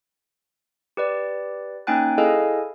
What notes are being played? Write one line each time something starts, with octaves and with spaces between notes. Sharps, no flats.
G4 B4 D5
A#3 C#4 D#4 G5 G#5 F#6
E4 G#4 A4 D#5 F5 G#5